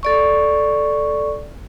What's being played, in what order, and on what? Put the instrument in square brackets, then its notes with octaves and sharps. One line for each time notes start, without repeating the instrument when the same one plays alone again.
[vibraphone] A4 D5 C#6